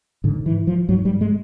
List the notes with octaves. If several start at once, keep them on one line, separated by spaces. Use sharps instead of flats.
G#2 D3
E3
F3
G#2 F#3
G3
G#3